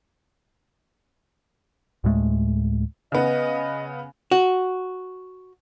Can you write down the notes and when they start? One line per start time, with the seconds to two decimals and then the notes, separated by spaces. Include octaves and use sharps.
2.04 D2 A2 G#3 A3
3.12 C#3 B3 D#5
4.31 F#4